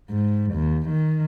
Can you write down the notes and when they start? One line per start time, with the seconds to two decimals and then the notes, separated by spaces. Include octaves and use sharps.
0.10 G#2
0.54 D#2
0.90 D#3